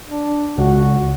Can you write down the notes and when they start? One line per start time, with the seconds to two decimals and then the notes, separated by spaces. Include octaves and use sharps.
0.10 D4
0.58 C#2 F#4